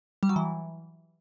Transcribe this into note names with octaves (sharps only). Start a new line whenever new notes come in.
G3
F#3
E3